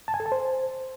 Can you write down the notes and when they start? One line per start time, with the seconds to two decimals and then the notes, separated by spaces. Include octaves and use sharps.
0.08 A5
0.14 G#5
0.20 A4
0.26 A5
0.32 C5